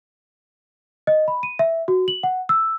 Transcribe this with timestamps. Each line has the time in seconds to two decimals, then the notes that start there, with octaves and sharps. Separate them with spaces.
1.07 D#5
1.28 B5
1.43 D#7
1.59 E5
1.88 F#4
2.08 F#7
2.23 F#5
2.49 E6